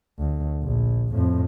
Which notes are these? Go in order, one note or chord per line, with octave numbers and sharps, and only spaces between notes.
D2
A#1
F2 A2